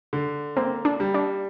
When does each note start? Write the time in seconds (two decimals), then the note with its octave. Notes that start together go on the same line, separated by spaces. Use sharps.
0.13 D3
0.56 A#3 C4
0.85 D4
1.00 G3
1.14 D4